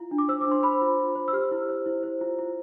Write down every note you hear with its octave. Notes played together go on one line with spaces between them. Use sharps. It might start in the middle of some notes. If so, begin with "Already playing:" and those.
Already playing: E4 F4
D4
D6
C5 E6
D6
D4 C6
C5 B5
F4
F4
C5
E6
G4 F6
E4
C5
E4
C5
F4
F4